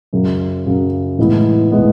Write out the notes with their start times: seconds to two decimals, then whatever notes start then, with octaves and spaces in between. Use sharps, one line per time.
0.13 F#2 C#3 F#3
0.66 F#2 C#3 F#3
1.19 A2 E3 G#3 B3 E4
1.71 A2 E3 G#3 B3 E4